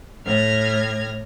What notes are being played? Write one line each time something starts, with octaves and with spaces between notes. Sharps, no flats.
A2 F6 G#6 A#6